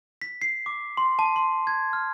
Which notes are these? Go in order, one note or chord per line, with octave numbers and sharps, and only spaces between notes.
B6
C7
D6
C6
A5
C6
G#6
F6